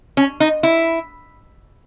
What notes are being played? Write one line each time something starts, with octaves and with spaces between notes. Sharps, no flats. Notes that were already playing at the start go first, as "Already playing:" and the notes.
C#4
D#4
E4